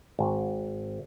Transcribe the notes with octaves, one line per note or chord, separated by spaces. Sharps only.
G#1